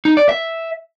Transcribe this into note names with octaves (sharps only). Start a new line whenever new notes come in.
D#4
D5
E5